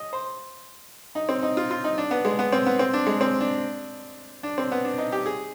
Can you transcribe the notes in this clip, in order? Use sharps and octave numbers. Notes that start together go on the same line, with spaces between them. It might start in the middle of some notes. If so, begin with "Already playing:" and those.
Already playing: D#5
C5
D#4
C4
D#4
F4
F4
D#4
D4
B3
G#3
B3
C4
B3
C4
D4
G#3
C4
D4
D4
C4
B3
D4
D#4
G4
G#4